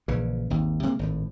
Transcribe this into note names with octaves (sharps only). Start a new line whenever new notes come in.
A#1 C#3 E3
G#1 D#2
C3 G#3 A#3
G#1 A2